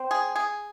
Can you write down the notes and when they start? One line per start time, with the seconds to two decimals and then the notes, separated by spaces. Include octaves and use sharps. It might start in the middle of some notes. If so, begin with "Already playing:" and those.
Already playing: C4
0.11 G#4
0.36 G#4